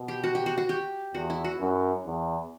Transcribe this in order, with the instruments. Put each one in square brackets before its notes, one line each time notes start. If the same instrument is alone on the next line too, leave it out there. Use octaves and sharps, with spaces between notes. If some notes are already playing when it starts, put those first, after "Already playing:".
Already playing: [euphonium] B2
[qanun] G4
F#4
G4
F#4
F#4
G4
[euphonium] E2 [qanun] F#4
[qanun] E4
F#4
[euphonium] F#2
E2